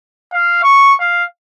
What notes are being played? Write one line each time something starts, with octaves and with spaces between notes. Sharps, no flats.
F5
C#6
F5